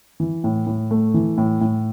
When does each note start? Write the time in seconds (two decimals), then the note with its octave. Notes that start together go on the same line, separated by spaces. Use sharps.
0.20 E3
0.44 A2
0.67 A2
0.91 A3
1.14 E3
1.38 A2
1.61 A2